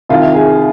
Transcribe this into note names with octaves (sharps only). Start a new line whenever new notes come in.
C2 C3 D#3 F4
G#4